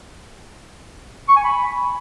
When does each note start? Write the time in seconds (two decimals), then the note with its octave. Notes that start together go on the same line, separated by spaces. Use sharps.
1.28 C#6
1.36 G#5
1.44 B5